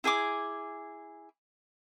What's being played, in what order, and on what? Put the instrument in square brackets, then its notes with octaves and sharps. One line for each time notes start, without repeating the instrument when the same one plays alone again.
[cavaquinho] E4 G#4 G#5 D6